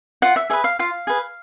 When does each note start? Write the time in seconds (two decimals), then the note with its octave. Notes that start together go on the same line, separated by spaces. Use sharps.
0.22 F4 F#5
0.36 E5
0.50 G#4 B4 E5
0.64 F5
0.79 F4 F5
1.07 G#4 B4